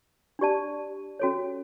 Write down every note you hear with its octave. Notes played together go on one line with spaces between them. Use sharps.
D4 G4 D5 A5
C#4 F#4 A4 C#5